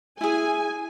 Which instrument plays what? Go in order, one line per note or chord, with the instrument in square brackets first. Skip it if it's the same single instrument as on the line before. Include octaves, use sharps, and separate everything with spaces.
[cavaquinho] E4 G#4 [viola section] G#5